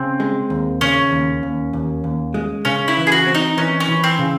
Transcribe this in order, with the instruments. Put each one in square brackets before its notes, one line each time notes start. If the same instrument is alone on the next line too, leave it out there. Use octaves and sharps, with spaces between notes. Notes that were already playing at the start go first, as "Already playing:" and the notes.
Already playing: [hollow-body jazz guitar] C#3 [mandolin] C4
[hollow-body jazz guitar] G#3
D#2
[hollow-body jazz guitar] C#3 [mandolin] C#4
[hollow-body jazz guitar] D#2
D#2
D#2
D#2
G#3
[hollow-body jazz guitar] C#3 [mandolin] C#4
[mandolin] E4
[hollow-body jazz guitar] E3
[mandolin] G#4
F#4
[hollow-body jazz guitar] C4
[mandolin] D#4
[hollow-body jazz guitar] E3 [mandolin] C#4
[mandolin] C#4
[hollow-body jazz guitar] E3
[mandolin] C4
[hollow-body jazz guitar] C#3